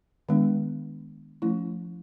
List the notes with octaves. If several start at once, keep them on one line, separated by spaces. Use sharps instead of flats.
D#3 G#3 B3 D4
F3 A3 C#4 E4